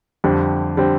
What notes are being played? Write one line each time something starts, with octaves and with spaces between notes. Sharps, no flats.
F2 D3 G3 C4
D3 G3 C4